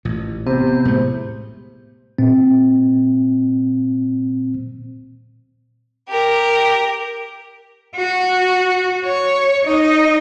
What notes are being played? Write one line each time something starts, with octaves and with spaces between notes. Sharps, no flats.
A1 A#2
C3 B3 C5
A2 G#3 A3
A#2 C4
G4 A#4
F#4
C#5
D#4 D#5